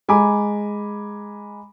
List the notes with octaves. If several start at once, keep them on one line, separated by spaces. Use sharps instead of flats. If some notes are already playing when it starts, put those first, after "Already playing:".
G#3 G#5 A#5 B5 D6